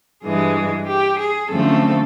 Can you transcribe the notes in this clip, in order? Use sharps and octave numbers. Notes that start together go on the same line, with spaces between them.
G2 E3 G#3 G#4
G4
G#4
F#2 D3 F3 A3 C4 A4